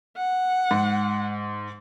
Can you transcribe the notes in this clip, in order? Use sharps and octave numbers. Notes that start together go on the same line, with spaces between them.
F#5
G#2